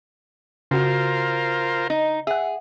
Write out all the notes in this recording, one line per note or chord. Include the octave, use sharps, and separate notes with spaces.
C#3 F4 F#4 A#4 C5
D#4
G#4 E5 F#5